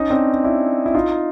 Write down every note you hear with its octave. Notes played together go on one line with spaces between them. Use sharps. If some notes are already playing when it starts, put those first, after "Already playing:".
Already playing: C#4 D#4
C4 D4
D4 E4
E4
D#4 F4